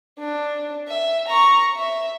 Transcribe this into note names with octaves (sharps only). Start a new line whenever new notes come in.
D4
E5
A#5 C#6
E5